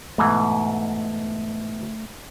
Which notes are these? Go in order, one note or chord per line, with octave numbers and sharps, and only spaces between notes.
G#2 B2 E3 A3